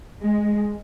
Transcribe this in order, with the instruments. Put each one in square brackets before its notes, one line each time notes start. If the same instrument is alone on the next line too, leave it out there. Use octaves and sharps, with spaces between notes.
[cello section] G#3